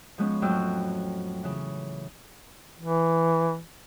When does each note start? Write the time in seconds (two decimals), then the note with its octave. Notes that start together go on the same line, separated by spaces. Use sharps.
0.18 F3 G#3 B3 C#4
0.42 F2 A2 F#3 G5 E6 G6
1.43 C#3 E3
2.80 E3